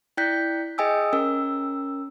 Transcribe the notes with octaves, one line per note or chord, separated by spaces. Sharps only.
E4 D5 G5 F#6 G6 B6
G#4 D#5 G5 G#5 D#6 E6
C#4 A#4 E6